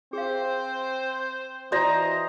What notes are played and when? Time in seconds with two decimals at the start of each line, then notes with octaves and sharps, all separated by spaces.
0.13 C4 G#4 C5 F5
1.72 E3 F#4 B4 C5 D5 D#5 A#5